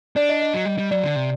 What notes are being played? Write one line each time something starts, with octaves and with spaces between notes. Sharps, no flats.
D4 D5
D#5
D#5
F#3
G3
G3
F#3 D5
D3
C3